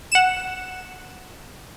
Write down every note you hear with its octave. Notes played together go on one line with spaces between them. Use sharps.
F#5 E7